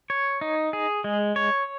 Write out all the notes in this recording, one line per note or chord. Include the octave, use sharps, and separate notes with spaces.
C#5
D#4
G#4
G#3
C#5